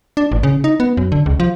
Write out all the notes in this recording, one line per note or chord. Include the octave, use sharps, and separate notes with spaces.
D4
A1
C#3
D#4
B3
F#2
D3
C#2
F3